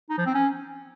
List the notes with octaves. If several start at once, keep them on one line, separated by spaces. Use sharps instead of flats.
D#4
F3
C4
C#4